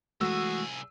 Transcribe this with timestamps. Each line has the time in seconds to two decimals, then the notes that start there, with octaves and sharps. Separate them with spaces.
0.21 C2 E3 G#3 A3 F#4 G#4 E6